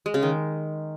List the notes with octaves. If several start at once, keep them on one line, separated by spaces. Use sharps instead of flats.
G#3
C#3
D#3